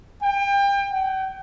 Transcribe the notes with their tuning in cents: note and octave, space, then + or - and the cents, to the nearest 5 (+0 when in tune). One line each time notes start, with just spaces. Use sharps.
G5 +30
G5 -45